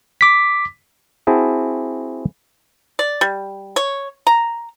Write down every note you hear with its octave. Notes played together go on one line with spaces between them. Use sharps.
D6 B6
C4 E4 F#4 G#4 A5
D5
G3
C#5
A#5